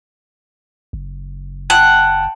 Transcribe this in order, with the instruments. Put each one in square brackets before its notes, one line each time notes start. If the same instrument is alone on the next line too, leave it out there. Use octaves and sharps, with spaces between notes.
[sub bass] F#1
[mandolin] F#5 [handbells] G5 A5